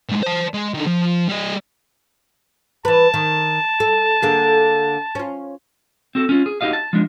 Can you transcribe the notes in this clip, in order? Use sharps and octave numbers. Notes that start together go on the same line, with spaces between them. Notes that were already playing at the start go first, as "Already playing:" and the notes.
A2 G#3
C5 A5
G#3
D3 D#3
F3
G3 D#5
E3 B4 A5
D#3
A4
D3 A#3 G#4
C#4 F4
C4 F#4 A4
C#4 F4
G#4
D#4 F#4 G4 D#5 F5
A5
F3 G#3 D4